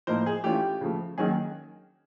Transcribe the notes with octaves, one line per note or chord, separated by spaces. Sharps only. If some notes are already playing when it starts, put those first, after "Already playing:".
A2 F3 A#3 D#4 A#4 C5
G#4
E3 A3 C#4 F4 G4
C#3 F3 A3
D#3 F#3 A#3 C#4 G#4